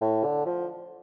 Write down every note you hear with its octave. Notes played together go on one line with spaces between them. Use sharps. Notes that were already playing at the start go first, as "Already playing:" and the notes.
A2
D3
F3